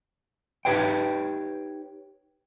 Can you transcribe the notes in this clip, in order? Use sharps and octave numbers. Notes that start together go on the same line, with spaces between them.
D#4 G4 B4 C#5 G5